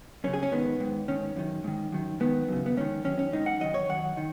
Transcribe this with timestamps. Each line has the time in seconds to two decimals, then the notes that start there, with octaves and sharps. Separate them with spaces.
0.24 F#2 C#3 C#4
0.33 G#4
0.43 C#4
0.52 G#2 D#3 B3
0.80 G#2 D#3
1.08 G#2 D#3 C#4
1.36 F#2 D#3
1.64 G#2 D#3
1.92 F#2 D#3
2.20 G#2 D#3 B3
2.48 F#2 C#3
2.66 B3
2.77 G#2 D#3 C#4
3.04 F#2 D#3 C#4
3.19 C#4
3.32 G#2 D#3 D#4
3.46 F#5
3.60 F#2 D#3 D#5
3.74 C#5
3.89 F#2 D#3 F#5
4.17 D#3